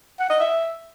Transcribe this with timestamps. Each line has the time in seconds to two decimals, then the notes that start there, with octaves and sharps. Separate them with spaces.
0.19 F#5
0.29 D#5
0.40 E5